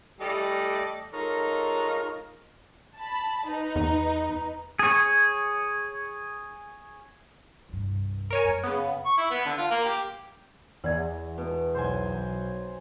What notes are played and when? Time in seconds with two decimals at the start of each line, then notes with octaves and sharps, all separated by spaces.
0.20 E3 G3 A3 A4 D5 D#5
1.13 G#3 D#4 F4 A4 A#4 C#5
2.97 A5 B5
3.47 D#4 B4
3.76 E2
4.79 G#4 C#5
7.69 C2 G2
8.31 A#4 C#5 G#5
8.44 F#2
8.64 C#3 B3
9.05 C#6
9.18 E4
9.30 B3
9.46 D3
9.58 F4
9.71 A#3
9.85 G4
10.84 E2 E3 D5 G#6
11.38 B2
11.75 B1 F#3 C5 G#5